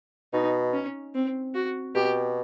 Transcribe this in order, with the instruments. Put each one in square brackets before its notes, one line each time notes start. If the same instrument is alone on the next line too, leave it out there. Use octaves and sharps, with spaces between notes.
[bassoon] B2 [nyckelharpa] D#4
[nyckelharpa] C#4
C4
F#4
[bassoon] B2 [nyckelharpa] G4